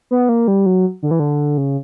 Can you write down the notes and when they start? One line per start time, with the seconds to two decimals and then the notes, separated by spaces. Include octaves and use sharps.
0.11 B3
0.29 A#3
0.48 G3
0.66 F#3
1.03 D3
1.11 E3
1.20 D3
1.58 C#3